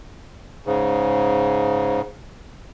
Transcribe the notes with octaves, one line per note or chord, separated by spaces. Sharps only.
G#2 C#3